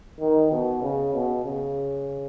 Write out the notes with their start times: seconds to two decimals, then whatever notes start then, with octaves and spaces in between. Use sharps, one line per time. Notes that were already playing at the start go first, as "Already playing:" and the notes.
0.20 D#3
0.51 B2
0.82 C#3
1.13 B2
1.44 C#3